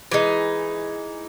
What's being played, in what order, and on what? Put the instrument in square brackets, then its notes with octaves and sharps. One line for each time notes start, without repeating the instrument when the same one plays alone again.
[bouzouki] E3 G#3 D#4